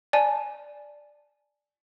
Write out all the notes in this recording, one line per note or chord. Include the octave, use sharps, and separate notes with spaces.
D5 G#5 A5